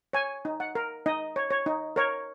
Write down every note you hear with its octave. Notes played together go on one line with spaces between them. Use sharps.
C#5 G#5
D#4
F#5
A#4
D#4 D#5
C#5
C#5
D#4
A#4 C#5